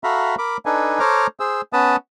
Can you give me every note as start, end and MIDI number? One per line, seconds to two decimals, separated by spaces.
0.04 0.35 66
0.04 0.35 69
0.04 0.35 76
0.04 0.35 77
0.04 0.35 82
0.04 0.35 83
0.38 0.57 70
0.38 0.57 83
0.38 0.57 86
0.66 0.99 62
0.66 0.99 63
0.66 0.99 69
0.66 0.99 71
0.66 0.99 80
1.00 1.27 69
1.00 1.27 72
1.00 1.27 73
1.00 1.27 82
1.00 1.27 86
1.00 1.27 89
1.40 1.61 68
1.40 1.61 72
1.40 1.61 88
1.73 1.96 59
1.73 1.96 61
1.73 1.96 71
1.73 1.96 81
1.73 1.96 87